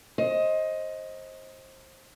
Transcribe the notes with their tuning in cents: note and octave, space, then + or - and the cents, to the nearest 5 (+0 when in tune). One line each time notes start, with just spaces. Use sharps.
C5 +25 D#5 +15